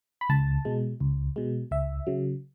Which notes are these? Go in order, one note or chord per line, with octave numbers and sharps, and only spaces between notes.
B5
C#2 A5
B2 G#3
C#2
B2 G#3
C#2 E5
C#3 F#3